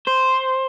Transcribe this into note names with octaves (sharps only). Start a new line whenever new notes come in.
C5